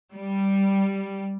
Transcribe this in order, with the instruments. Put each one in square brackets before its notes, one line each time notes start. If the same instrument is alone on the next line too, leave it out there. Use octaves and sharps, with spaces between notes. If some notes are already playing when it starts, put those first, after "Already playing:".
[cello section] G3